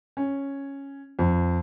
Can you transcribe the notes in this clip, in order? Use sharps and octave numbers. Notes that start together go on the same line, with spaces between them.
C#4
F2